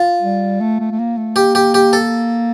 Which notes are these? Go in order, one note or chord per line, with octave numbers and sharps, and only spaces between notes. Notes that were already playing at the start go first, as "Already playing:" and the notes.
Already playing: F4
G3
A3
A3
A3
A#3
A3
A#3 G4
G4
G4
A4